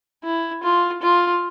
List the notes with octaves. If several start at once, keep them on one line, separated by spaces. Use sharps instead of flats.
E4
F4
F4